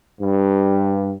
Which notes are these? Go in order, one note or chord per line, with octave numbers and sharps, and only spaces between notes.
G2